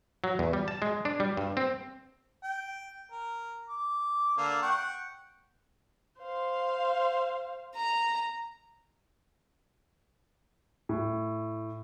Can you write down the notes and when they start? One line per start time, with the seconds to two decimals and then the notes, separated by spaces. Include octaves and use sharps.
0.24 F#3
0.39 E2
0.53 G3
0.68 A5
0.82 G#3
1.05 D4
1.20 G3
1.37 G2
1.57 C4
2.44 G5
3.12 A#4
3.69 D6
4.38 D3 A#3
4.62 F#5 G5 C#6
6.20 C5 F5
7.76 A#5
10.89 A2